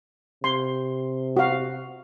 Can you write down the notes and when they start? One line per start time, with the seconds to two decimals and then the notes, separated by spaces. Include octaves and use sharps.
0.44 C3 C6
1.37 F#4 F5